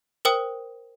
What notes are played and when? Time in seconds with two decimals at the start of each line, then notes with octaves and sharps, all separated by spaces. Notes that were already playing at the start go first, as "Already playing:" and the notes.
0.25 A#4 C5 G5 D#6